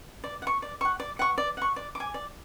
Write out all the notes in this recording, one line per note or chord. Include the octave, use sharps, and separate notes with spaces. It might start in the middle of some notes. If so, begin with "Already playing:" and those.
D5
F#5
C#6
D5
F#5 C#6
D5
F#5 C#6
D5
F#5 C#6
D5
G#5 D6
D5